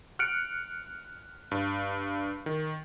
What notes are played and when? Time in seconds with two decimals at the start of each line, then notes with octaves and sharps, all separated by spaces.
0.19 F6 F#6 C#7 D7
1.51 G2
2.46 D#3